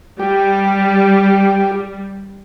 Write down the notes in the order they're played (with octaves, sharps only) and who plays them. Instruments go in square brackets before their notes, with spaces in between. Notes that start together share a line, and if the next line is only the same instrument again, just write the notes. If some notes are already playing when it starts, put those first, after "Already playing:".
[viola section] G3 [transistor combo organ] G4